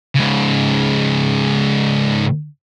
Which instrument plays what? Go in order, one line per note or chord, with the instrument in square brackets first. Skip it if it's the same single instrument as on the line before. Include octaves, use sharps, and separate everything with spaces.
[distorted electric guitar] G#2 C#3